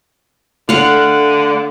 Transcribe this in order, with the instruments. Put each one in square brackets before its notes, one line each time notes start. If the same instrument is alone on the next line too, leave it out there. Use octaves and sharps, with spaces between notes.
[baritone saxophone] D3 [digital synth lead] A3 [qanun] F5 F#5